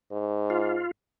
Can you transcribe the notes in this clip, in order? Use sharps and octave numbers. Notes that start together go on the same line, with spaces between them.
G#2
F4